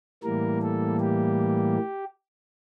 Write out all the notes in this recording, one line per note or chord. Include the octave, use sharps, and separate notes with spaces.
A2 E3 G3 A#3 A#4
A4
G4